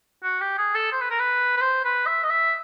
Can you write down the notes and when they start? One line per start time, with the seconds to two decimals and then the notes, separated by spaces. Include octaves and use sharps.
0.23 F#4
0.41 G4
0.58 G#4
0.75 A4
0.92 C5
1.01 B4
1.11 A#4
1.19 B4
1.57 B4
1.61 C5
1.85 B4
2.07 E5
2.24 D#5
2.30 E5